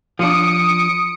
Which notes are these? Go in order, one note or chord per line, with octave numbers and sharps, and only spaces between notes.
F3 D4 D#6 C#7 D7